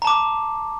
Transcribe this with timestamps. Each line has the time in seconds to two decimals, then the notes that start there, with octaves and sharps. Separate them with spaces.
0.02 A#5
0.05 A5
0.07 D6